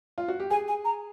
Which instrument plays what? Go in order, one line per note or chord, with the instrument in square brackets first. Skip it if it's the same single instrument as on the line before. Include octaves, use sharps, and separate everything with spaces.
[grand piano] F4
F#4
G4
[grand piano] G#4 [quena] G#5
[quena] G#5
A#5